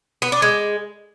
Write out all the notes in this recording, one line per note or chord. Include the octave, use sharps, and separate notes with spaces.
B3
D4
G#3